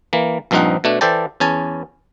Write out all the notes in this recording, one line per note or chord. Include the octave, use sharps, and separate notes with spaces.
E3 A#3
A#1 G2 F3 C4 D#4 F#5
B2 A3 D4
E3 A4 C5 D5 G5 A5
E2 C#4 G#5 A5